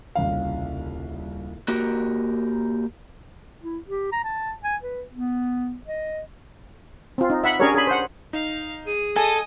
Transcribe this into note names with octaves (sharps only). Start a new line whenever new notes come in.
D#1 C2 C#3 F5
A#3 F#4 G4 A#4
E4
G4
A#5
A5
G#5
B4
B3
D#5
C4 F4
D#4
E5 F#5 B5
C#4 D4 G4 G#4 A#4 C#5
G#4 B5
C5 F#5
D#4 F5
G#4 D#7
A4 D#5 G#5 D#6